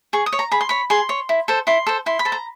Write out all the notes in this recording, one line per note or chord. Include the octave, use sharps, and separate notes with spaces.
G#4 C#6
D#6
C#5
A#5
G#4 B5
C6
C#5 B5
G#4 C6
C#5
E4
A4 C5
E4 C6
A4 C5
E4 C6
B5
A4 C5
A#5